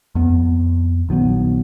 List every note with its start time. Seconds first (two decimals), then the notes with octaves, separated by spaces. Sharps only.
0.15 F2 B3
1.09 A#1 D#3 F#3 B3